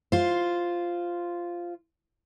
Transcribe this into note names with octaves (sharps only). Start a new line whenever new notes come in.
F4 C5